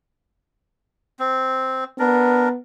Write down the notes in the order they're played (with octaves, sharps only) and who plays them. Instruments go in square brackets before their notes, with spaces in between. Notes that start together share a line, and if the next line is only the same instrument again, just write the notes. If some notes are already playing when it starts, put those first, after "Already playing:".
[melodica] C4
[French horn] B3 [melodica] D4 A#4